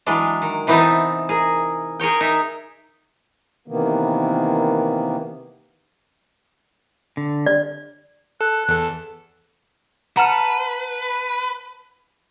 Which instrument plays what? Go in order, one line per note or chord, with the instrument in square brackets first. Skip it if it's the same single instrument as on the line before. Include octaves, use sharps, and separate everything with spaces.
[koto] E3 F#3 G#3 D4
D#3
C3 E3 B3 C4 D#4 A5
G#4 A#4
G#4 A#4 C#5 G5
D#4 E5
[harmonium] C3 D#3 E3 A#3 B3
[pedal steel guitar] D3
[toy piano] D5
[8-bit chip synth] A4 [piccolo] F#6
[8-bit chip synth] E2 A4
[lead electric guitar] B4 [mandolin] F#5 A5 F6 [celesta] A#5